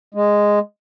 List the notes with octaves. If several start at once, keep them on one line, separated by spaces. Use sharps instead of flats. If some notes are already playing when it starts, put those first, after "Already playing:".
G#3